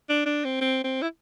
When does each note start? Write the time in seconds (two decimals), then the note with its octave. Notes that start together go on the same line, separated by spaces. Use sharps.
0.09 D4
0.26 D4
0.44 C4
0.61 C4
0.84 C4
1.01 E4